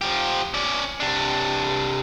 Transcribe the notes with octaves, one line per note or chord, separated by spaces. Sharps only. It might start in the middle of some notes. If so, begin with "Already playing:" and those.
F3 G4
C#4 D5
C3 D4